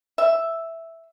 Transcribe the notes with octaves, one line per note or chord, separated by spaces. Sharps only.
E5